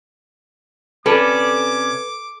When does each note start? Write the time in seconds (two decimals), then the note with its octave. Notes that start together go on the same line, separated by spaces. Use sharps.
1.06 C3 C#4 A4 B4 D5 D6